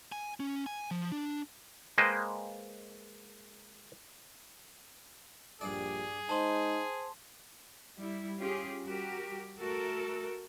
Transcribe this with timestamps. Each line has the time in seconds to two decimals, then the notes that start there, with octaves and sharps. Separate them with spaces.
0.12 G#5
0.40 C#4
0.66 G#5
0.91 F3
1.12 D4
1.98 G#3 A#3 B4 C5 D#5 G5
5.61 A#1 G2 G3 G4 G#4 D5
6.29 G#3 D#4 C5 A5 C6
7.99 G3 E4
8.40 C#4 F4 G4 G#4
8.83 G3 F#4 G4 A#4
9.57 A3 F#4 A4 A#4